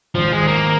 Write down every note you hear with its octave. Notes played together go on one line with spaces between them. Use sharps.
G#1 F3
G#3
G#1
A#3